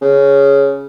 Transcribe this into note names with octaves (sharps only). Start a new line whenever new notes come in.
C#3